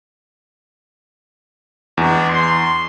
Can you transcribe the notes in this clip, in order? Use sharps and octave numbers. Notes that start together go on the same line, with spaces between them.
E2 G#3 D4
C6